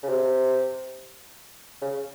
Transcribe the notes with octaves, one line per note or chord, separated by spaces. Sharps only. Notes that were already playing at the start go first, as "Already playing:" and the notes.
C#3
C3
C#3